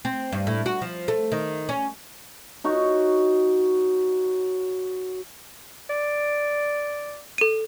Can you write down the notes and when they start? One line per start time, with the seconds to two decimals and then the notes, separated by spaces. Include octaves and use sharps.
0.05 C4
0.33 G2
0.47 A2
0.66 F#4
0.82 F3
1.08 A3
1.32 D#3
1.69 C#4
2.64 D#4 F#4 C#5
5.90 D5
7.38 A4 D#7